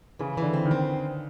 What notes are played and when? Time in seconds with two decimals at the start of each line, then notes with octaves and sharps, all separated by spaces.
0.19 C#3 E3
0.37 D3 E3
0.53 C4
0.65 D#3
0.71 C4